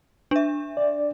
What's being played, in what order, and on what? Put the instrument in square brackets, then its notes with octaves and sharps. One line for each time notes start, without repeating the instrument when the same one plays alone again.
[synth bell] D4 E5
[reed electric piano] D5